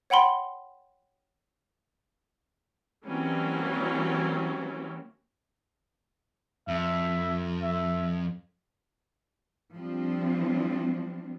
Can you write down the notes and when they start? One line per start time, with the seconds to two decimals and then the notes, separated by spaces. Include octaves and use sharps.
0.10 C#5 F#5 G5 B5 C6
3.06 E3 F#3 G3 A#3 C4 C#4
6.68 F2 E5
7.62 E5
9.75 F3 G3 C4 D4